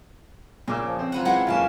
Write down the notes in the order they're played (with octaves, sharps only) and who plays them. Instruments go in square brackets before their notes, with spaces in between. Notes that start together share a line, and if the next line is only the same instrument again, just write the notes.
[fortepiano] A#2 D6 E6 [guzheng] C#3
[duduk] F3
[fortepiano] C4
[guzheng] F#3 B4 F#5 [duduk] F4
[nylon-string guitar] E3 F#5 [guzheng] G#3 E4 G4
[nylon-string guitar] F#2 E3 A5 [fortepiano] A#3 F4 [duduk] C#4